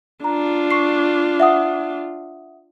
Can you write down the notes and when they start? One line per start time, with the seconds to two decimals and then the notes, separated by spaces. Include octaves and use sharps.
0.24 D4 F4 A#5
0.71 C#6 C7
1.40 E5 F#5 D#6